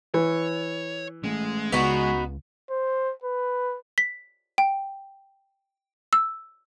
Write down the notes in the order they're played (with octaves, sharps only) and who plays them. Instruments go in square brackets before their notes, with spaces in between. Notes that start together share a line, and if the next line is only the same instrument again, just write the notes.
[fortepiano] E3 [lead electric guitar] C#5
[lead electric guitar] G#3 [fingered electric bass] A3 B3 C#4
[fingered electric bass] C#2 C#3 [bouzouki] B3 D#4 F#4
[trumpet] C5
B4
[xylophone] B6
G5
E6